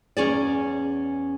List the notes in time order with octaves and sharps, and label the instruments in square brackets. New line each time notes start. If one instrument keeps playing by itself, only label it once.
[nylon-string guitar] E2 C#4 G#4 D5